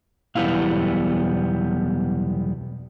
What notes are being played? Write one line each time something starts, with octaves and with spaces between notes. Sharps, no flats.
B1 E2 G3 B3 E4 F5